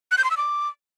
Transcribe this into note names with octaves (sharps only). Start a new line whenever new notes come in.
F#6
G6
C6
E6
D6